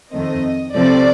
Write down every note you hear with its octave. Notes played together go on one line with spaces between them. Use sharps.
F2 D#3 A3 C4 D#5
C3 F3 A3 C4 D5